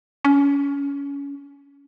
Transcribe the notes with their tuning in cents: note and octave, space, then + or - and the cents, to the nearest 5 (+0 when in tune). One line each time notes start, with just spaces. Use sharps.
C#4 +25